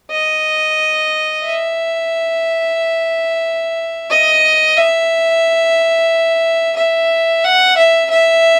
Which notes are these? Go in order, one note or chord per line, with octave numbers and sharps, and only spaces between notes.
D#5
E5
D#5
E5
E5
F#5
E5
E5